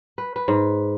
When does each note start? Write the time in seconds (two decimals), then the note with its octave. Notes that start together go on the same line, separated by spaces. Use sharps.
0.18 B4
0.36 B4
0.48 G#2